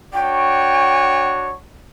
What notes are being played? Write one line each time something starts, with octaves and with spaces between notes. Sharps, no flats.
D4 F#4 C#5 G5